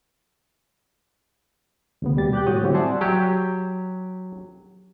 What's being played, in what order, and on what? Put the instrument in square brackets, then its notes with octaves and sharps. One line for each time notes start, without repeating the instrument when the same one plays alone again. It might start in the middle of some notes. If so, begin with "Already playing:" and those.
[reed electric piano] D2 C#3 B3
D#2 B2 G3 G4 A6
G4 F#6 G6
A2 F#4 C#5 D#6
D3 F#3 G3 C4 E4 F#4
D5 E5 F#5 G#5 A5 C6
[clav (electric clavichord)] F#3 G4